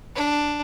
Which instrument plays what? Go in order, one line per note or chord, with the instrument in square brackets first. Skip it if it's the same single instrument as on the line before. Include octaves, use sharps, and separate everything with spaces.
[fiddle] D4